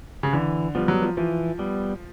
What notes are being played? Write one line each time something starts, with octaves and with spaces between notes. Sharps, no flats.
C#3
D3 E3
F3 G3 B3
F#3
F3
E3 F3
G3 B3